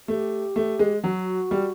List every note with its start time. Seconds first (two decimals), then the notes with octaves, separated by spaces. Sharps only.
0.08 A3 G4
0.56 A3
0.79 G#3
1.03 F#3 F#4
1.51 G3